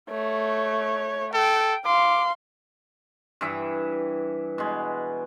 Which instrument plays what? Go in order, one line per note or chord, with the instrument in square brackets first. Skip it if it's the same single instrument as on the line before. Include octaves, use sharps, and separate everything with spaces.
[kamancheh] A3 C#5
[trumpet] A4 [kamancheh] G5
[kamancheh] F5 C6 [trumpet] D6
[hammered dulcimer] G2 E3 E5
B2 G#3